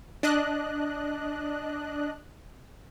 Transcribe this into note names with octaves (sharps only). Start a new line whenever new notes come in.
D4 D#5 F#6